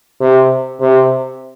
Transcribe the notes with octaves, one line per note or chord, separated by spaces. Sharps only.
C3
C3